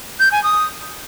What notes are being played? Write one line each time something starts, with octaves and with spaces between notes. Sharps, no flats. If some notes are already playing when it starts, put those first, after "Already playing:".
G6
G#5
D#6